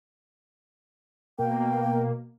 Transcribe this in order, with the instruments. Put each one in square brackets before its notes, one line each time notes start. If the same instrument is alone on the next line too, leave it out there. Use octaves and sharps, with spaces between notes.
[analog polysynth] B2 A#3 [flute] G5